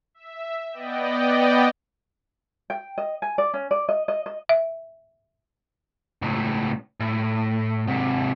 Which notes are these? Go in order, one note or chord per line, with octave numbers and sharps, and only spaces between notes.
E5
B3 D5 D#5 G5
G5
D#5
G#5
D5
C#4
D5
D#5
D#5
D#5
E5
C#2 A2
A2
G#2 C3